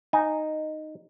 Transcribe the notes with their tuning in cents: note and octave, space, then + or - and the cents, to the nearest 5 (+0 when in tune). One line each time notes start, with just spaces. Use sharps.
D#4 -5 G#5 +0